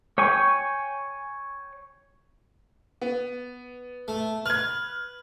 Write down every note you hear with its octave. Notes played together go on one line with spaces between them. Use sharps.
C#5 G5 G#5 C#6
B3
A3
B4 F6 G#6